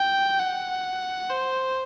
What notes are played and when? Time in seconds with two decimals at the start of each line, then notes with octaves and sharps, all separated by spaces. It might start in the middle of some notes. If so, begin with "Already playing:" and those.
Already playing: G5
0.39 F#5
1.29 C5